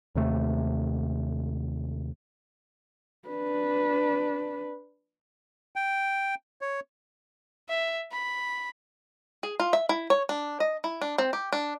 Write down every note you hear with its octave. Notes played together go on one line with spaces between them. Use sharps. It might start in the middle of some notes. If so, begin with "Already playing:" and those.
D#2 C3 A3
D4 B4
G5
C#5
E5
B5
G#4
F4
E5
E4
C#5
D4
D#5
E4
D4
C4
G4
D4